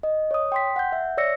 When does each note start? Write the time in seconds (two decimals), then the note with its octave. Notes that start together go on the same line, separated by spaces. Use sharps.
0.03 D#5
0.31 C#5 D#6
0.52 G5 C6 B6
0.76 F#5 G6
0.92 E5
1.17 C#5 D5 E6 A#6 C#7